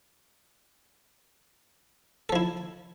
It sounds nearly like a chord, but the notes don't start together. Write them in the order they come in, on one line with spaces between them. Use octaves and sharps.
A4 F3 E4